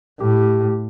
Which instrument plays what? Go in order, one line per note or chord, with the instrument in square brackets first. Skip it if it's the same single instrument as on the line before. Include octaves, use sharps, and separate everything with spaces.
[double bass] A2 [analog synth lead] G4